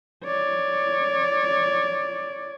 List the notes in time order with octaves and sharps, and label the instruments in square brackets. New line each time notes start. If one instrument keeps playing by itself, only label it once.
[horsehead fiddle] C#5 D5